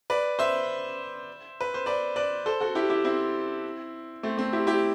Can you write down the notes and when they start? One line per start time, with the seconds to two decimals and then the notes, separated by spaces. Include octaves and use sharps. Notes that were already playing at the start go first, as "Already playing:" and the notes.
0.10 B4 D5
0.39 C5 E5
1.61 B4
1.74 C5
1.86 B4 D5
2.16 B4 D5
2.46 A4 C5
2.60 F#4 A4
2.75 E4 G4
2.90 E4 G4
3.04 C4 E4
4.23 A3 C4
4.38 A3 C4
4.53 E4 G4
4.67 E4 G4